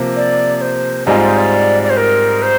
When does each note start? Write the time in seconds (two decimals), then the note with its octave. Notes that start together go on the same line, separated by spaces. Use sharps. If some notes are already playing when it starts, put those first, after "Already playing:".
Already playing: C3 F3 A#3
0.16 D5
0.61 C5
1.07 G#2 G3 C4 F4 G#4 D#5
1.17 D5
1.27 C5
1.38 D5
1.83 D5
1.90 C5
1.97 A#4
2.42 C5